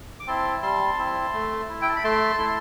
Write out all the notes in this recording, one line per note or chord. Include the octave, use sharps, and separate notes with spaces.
D6
C4 E4 A5 C6
G3 A5 C6
C4 E4
A3
E4
G5
A5
B5
A3 A5 C6
E4